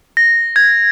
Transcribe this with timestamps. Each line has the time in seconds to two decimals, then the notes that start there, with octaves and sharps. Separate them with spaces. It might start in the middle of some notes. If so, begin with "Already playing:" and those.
0.17 A#6
0.56 G#6